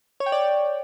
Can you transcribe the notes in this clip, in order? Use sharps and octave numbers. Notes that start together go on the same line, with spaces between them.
C#5
G5
D5